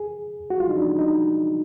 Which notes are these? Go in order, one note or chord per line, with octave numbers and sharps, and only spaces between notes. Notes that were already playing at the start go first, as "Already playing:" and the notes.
Already playing: G#4
F#4
F4
D#4
D4
D#4